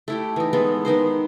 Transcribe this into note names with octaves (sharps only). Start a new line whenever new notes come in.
A3 E4 G4
E3 D#4
G#3 B3 A4
D#3 B3 D#4 C5